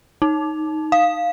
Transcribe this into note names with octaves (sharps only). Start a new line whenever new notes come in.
D#4
F5